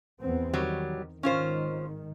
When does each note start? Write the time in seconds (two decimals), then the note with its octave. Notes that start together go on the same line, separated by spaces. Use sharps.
0.20 E2 B3 C4
0.54 D#3 F#3 G3
1.23 G#1 D#3 C#4 F4 C5